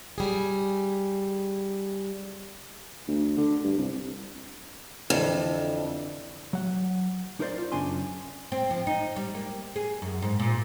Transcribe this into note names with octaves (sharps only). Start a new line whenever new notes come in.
G3 G#4
D2
D3
G2
C2
F2 D3 E3 D4
F#3 F#5
D#4 A#4 C5 D5
F4
F#2 C#3 D4 G#5 C6
C4
F3
D#4
G3
A#3
G#4
F#2
G#2
A#2